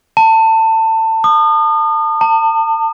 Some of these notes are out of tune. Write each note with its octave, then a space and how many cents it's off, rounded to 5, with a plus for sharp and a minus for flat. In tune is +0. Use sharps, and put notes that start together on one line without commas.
A5 +25
D#6 -35
A5 +40